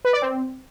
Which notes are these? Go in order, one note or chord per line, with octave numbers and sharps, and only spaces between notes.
B4
D5
C4